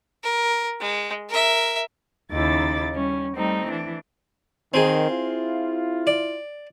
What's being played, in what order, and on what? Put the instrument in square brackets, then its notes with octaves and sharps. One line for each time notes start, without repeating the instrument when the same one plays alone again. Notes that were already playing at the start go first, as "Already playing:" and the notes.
[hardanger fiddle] A#4
G#3
A#4 E5
[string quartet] D#2 C#3 D#4 E4 D6 A6
G3 C#4
G3 A3 C4 D#4
E3 D4
[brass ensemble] D#3 [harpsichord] C4 G#4
[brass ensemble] E4 F4
[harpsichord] D5